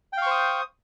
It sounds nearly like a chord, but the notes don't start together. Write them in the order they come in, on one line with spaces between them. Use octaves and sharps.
G5 F5 C#6 C5 D#6